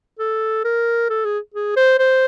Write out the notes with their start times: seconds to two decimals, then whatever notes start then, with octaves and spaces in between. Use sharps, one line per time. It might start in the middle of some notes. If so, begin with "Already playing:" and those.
0.19 A4
0.64 A#4
1.10 A4
1.25 G#4
1.54 G#4
1.77 C5
1.99 C5